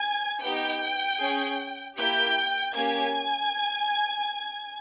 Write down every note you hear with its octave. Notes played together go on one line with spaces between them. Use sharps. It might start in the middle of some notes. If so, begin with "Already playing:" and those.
Already playing: G#5 G#6
B3 D#4 G4 G5 G6
C#4 G#4
A#3 E4 G4 G5 G6
A#3 C#4 G4 G#5 G#6